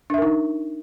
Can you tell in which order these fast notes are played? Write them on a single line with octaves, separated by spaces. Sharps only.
D4 E5 A#4 D#4